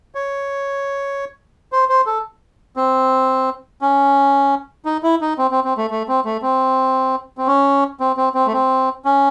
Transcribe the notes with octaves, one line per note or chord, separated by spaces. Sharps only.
C#5
C5
C5
A4
C4
C#4
D#4
E4
D#4
C4
C4
C4
A3
A3
C4
A3
C4
C4
C#4
C4
C4
C4
A3
C4
C#4